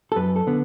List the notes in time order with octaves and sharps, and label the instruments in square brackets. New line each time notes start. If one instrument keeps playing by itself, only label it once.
[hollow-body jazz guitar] A4
F#2 B4
A4
D3 B3